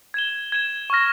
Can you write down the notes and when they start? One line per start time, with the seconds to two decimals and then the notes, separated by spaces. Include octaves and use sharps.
0.14 G#6 E7 G7
0.52 G#6 E7 G7
0.90 C#6 F6 A#6